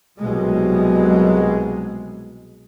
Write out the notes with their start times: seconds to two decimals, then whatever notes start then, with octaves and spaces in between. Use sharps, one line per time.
0.18 C2 B2 F#3 G#3